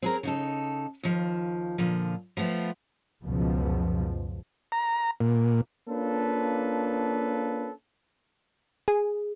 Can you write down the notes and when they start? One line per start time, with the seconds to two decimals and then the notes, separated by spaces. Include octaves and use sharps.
0.02 C4 G#4 A#4
0.23 C#3 D#4 A4
1.03 D#2 F3
1.78 A#2 D3 F3
2.37 F3 A3 B3 F4
3.23 C#2 F#2 B2 F3
4.72 A#5
5.21 A#2
5.88 A#3 C#4 D4 F4 A4 B4
8.88 G#4